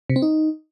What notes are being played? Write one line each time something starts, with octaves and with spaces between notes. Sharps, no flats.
C3
C4
D#4